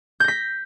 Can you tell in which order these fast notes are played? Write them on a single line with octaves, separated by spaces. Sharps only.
G6 A#6 B6